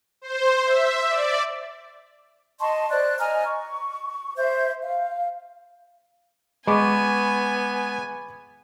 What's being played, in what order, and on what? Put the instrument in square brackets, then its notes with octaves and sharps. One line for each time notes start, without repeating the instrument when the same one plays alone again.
[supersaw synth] C5
E5
D5
[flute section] D#5 A5 C6 C#6
C5 D5 F#6
D#5 G#5 A#5 F6
C#6
C5 E5 G6
F5
[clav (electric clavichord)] G#3 [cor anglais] B3 [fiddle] G#5 [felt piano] B5 C#6 D6